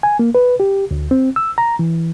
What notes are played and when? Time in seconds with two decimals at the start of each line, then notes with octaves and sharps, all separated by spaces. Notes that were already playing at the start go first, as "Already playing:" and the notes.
0.03 G#5
0.19 A#3
0.35 B4
0.60 G4
0.91 D2
1.11 C4
1.36 E6
1.58 A#5
1.79 E3